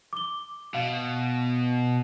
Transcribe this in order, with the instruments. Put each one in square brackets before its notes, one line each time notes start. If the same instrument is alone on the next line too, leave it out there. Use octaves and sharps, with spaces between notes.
[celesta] D6 G7
[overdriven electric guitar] B2 [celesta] F5